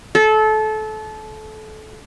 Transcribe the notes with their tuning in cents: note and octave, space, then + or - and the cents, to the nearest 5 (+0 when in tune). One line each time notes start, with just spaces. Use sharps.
A4 -25